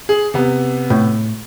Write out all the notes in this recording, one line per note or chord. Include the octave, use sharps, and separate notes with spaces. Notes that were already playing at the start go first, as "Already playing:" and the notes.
G#4
C3 B3
A2